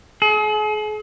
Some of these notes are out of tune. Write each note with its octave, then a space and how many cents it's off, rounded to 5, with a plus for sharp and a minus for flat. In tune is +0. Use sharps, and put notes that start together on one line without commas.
G#4 +40